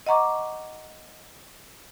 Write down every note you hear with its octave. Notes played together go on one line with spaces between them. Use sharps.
D#5 F#5 A#5 C#6 D6